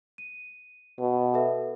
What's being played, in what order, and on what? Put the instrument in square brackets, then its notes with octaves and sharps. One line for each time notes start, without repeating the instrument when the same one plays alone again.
[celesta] D#7
[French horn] B2
[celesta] A4 B4 E5